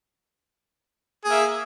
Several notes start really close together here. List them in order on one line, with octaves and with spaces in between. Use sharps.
G#4 A#3 E5